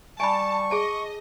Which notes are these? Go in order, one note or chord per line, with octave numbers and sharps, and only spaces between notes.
G3 G#5 A5 B5 C#6
G#4 D#5 A5